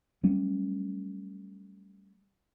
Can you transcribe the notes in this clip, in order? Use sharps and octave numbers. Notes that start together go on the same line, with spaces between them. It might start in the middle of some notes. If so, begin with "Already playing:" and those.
F#3 G3 A3 C#4